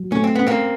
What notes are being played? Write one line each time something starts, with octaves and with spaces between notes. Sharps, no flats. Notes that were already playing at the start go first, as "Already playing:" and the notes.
Already playing: F#3
A3 C#4
C4
B3 C#4
A#3 C4